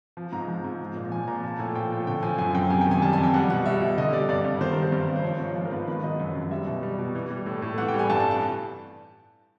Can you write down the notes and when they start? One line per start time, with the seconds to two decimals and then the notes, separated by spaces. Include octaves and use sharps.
0.17 F3
0.32 G#2 A#5
0.48 F3
0.64 G#2
0.80 F3
0.96 A#2
1.12 F3 G#5
1.28 A#2 A#5
1.44 F3 A5
1.59 A2 G#5
1.75 F3 G5
1.91 A2
2.07 D3 G5
2.23 F3 G#5
2.38 F#2 G#5
2.55 F#2 G5
2.70 C3 G#5
2.81 G5
2.86 D#3
2.91 G#5
3.02 G3 A5
3.13 F2 G#5
3.23 G5
3.34 G3 F#5
3.50 B2 F#5
3.66 G3 E5
3.81 B2
3.97 D3 D#5
4.13 G3 D5
4.29 G2 D5
4.45 G2
4.61 D#3 C5
4.71 A#4
4.77 G3
4.82 C5
4.92 G2
5.08 G2
5.16 C5
5.24 F3 C#5
5.40 G#2
5.56 F3
5.65 A#4
5.71 G#2 B4
5.87 D#3 B4
6.04 F#3 D#5
6.20 F#2
6.35 F#2
6.51 G3 E5
6.67 B2
6.83 G3
6.99 B2
7.15 E3
7.30 G3
7.46 A2
7.62 A2
7.78 E3 F#5
7.88 G5
7.94 G3
7.99 G#5
8.10 G2 A5
8.20 A5
8.31 A5